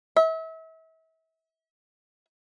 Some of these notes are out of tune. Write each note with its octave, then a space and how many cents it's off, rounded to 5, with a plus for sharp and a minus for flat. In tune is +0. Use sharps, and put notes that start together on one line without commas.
E5 -35